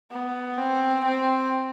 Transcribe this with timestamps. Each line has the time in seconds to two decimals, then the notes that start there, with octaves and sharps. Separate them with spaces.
0.12 B3
0.57 C4
1.04 C4